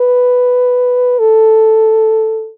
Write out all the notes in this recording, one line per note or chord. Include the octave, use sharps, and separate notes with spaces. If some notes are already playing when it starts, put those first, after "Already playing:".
Already playing: B4
A4